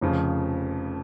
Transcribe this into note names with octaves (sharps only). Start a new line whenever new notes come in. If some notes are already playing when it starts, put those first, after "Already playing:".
F1 F2 C#3 F3